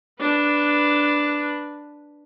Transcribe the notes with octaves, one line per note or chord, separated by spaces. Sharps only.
D4 B4